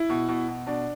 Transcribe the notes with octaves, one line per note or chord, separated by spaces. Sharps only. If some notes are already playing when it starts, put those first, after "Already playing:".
Already playing: E4
B2
B2
B2
B2 D4